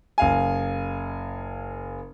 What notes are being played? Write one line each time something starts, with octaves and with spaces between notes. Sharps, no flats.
F#1 F5 G#5